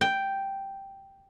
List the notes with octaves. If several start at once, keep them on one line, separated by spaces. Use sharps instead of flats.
G5